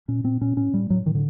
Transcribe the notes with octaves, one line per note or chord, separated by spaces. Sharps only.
A#2 C#4
A#2 C4
A#2 C#4
A2 C#4
A2 G3
A2 F#3
A2 D#3
D3